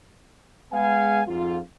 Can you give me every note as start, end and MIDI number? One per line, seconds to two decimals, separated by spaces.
0.73 1.22 56
0.73 1.22 59
0.73 1.22 77
0.73 1.22 80
1.27 1.60 41
1.27 1.60 44
1.27 1.60 65